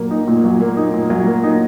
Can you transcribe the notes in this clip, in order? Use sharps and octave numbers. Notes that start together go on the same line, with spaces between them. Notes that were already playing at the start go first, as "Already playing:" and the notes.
Already playing: A#2 F#3 A#3
D#4
A#2
F#3
A#3
D#4
A#2
F#3
A#3
D#4